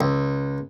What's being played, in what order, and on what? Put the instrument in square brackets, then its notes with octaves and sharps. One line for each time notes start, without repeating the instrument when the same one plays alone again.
[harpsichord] C#2